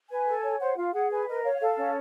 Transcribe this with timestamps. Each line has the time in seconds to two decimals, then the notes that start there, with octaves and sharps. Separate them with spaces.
0.10 B4 G#5
0.27 A4
0.44 C#5
0.60 C5 F#5
0.77 F4 F5
0.94 G#4 F#5
1.10 B4 G#5
1.27 A#4 D#5
1.44 C#5 F5
1.60 A4 F5
1.77 C#4